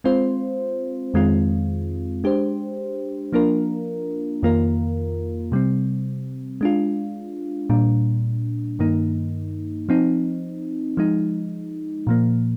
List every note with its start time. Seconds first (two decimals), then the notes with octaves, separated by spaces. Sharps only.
0.04 G#3 C4 F4 C5
1.14 F2 D#3 G#3 C4 F4
2.24 G#3 D4 G4 C5
3.32 F3 A#3 D4 F4 A#4
4.43 F2 D#3 A#3 F4 A#4
5.52 C3 G3 C4
6.61 G#3 D4 F4
7.70 A#2 G3 D4
8.79 G2 D#3 A#3 D#4
9.89 F3 C4 D#4
10.97 F3 G#3 D#4
12.07 A#2 F3 A#3